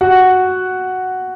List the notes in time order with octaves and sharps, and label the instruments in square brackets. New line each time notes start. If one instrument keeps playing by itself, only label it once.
[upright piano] F#4 F#5